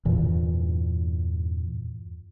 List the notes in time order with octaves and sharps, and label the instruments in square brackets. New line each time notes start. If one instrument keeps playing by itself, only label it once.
[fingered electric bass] E2 G2 A#2 E3